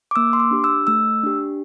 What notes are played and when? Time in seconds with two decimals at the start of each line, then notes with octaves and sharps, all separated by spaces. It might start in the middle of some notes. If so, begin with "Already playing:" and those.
0.11 D6
0.16 A#3 E6
0.33 C6
0.40 D6
0.51 D4 G4
0.64 E6
0.87 A3 E6
1.23 D4 G4